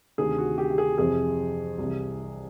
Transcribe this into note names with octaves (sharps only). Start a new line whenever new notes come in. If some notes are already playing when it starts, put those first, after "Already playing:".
D2 C3 D#3 G#4
F#4
G4
G4
G#4
F2 C3 E3 G#4
C2 C3 E3